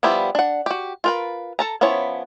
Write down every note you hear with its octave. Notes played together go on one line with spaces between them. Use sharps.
F3 G3 B3 E4 G4
D4 F#5
F#4 G4
F4 A#4 B4
A4 A5 A#5
F3 B3 C#4 E4 C#5